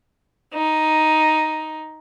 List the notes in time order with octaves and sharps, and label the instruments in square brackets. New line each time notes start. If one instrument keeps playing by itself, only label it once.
[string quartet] D#4